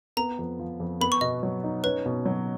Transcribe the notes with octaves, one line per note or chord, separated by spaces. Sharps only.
B3 A#5
F2
F3
F2
B3 B5
C#6
B2 D#5
F#3
D#4
C#4 B4
B2
F#3